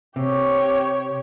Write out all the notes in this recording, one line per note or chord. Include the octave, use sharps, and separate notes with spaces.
C3 G4 C#5